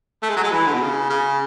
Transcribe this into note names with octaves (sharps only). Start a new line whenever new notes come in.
A3
G#3
F#3
G#3
E3
D3
B2
C#3
C#3